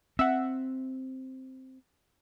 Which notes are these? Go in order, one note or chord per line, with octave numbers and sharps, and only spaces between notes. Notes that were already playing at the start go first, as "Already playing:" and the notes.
C4 E5 F#5